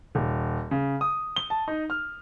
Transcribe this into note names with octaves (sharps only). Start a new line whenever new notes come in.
D#1
C#3
D#6
G7
A5
D#4
F6